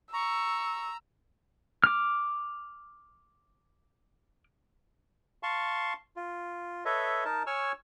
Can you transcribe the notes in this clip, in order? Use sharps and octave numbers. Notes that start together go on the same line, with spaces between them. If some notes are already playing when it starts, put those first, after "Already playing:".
A#5 C#6 E6
D6 F6
F5 A5 C6 C#6
F4
A4 B4 C#5 D#5 E5
D#4 A#4 A5
C#5 G#5 C#6 E6 F6